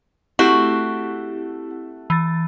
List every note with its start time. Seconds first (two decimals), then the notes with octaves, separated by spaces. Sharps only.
0.39 A3 C4 E4 F#4 G4 F#5
2.10 E3 A6